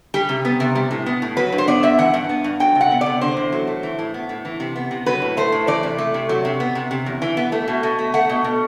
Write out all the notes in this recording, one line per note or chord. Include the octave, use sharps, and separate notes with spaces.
G3 G4
C3
B3
C3
G3
A2
B3
A2
F#3 B4
G2
C5
B3 D5
G2 E5
E3 F#5
G2
B3
G2
F#3 G5
C3
F#5
B3
D5
C3
D3 C5
E2
F#3
A3
E3
A2
B3
A2
E3
C3
B3
C3
F#3 B4
A2
A3 C5
A2
E3 D5
C3
A3
C3
F#3
C3
B3
C3
C3
E2
E3
B3
A3
B2
B2
A3
A3 F#5
B2
B2